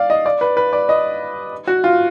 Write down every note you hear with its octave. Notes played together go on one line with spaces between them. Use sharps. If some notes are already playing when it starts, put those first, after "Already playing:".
Already playing: D5 F5
D#5
D5
B4
B4
D5
D#5
F#4
F4